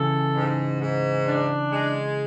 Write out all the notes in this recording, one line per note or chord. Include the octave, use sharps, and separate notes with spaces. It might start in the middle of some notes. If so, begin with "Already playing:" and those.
Already playing: C#3 E3 A4
G#2
G#2
D4
G#3